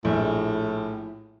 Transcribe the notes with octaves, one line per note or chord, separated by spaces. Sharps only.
A#1 A2